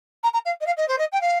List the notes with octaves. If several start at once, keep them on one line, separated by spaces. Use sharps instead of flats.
A#5
A#5
F5
D#5
F5
D#5
C5
D#5
G5
F5